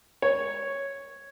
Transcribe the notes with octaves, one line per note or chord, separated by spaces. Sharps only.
C#5